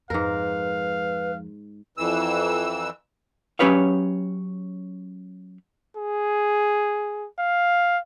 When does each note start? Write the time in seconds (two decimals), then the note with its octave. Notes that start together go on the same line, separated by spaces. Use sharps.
0.10 F2 G#2 A#4 B4 F5
1.98 F2 E3 E6
3.59 F#3 C#4 G4 B4 C#5 F5
5.96 G#4
7.39 F5